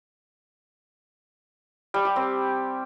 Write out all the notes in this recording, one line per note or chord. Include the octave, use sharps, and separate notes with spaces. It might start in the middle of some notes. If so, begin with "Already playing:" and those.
G3
G4
C4